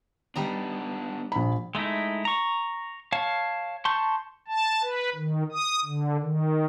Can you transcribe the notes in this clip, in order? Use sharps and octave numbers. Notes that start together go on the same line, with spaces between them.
G3 B3 D4 D#4 A#5
A#1 B5
G#3 A3 D#4 E4
A#5 C#6
C#5 F5 A5
A5 C6 C#6 G6
A5
B4
D#3
D#6
D3
D#3